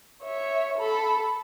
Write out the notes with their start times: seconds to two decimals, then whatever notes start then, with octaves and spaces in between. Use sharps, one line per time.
0.23 C#5 E5
0.78 A4 B5